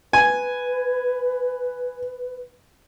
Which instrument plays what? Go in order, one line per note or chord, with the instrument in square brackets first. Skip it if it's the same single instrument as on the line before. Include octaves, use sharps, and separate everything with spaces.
[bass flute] B4 [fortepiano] G#5